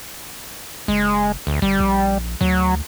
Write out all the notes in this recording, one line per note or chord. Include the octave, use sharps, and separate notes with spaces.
F#1 G#3
D2
G1 G3
A#1
D2 F#3